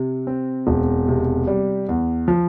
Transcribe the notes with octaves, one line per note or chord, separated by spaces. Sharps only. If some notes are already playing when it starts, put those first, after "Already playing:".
Already playing: C3
C4
E1
C3
G3
E2
F3